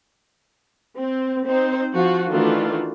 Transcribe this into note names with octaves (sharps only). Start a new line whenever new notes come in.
C4
C4 D#4 C5
F3 F4 F#4
D#3 E3 A3 D4 F4 F#4